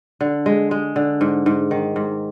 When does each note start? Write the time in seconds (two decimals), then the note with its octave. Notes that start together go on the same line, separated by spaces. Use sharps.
0.21 D3
0.46 G#3
0.71 G#3
0.96 D3
1.21 G#2
1.46 G#2
1.71 D#3
1.96 G#2